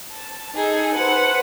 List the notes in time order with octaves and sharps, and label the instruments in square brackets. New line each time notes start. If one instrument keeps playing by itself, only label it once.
[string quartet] A5
D#4 G#4 A4
B4 C5 F#5